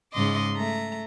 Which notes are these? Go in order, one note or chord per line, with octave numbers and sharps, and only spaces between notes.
G#2 C#3 D#5 C6 D6
A3 A#5